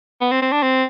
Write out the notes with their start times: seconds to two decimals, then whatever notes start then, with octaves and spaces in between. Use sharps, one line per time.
0.21 B3
0.32 C4
0.42 C4
0.52 D4
0.62 C4